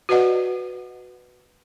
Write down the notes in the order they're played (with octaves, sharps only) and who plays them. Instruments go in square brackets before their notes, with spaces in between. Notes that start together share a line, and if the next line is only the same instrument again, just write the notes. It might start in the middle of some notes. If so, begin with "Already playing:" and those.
[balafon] F#4 B4 D5 D#5 F#5